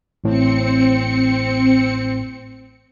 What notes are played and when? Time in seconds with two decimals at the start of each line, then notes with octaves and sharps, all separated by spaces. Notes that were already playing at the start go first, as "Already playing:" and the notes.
0.24 A1 A2 C4 C#7